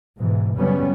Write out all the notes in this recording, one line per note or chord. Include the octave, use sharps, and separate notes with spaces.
G#2 B2 E3
F#2 C#3 G3 B3 C#4